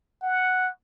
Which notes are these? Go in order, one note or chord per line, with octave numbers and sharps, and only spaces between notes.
F#5